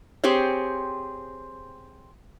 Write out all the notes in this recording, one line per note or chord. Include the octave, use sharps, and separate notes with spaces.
C4 G4 G#4 C5 C#5